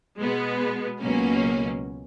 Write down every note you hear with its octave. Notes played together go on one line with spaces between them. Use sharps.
B2 G#3 B3
C#2 B2 F#3 A#3 C#4